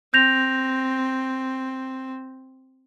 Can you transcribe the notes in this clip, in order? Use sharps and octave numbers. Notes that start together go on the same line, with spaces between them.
C4 G6 A#6 F7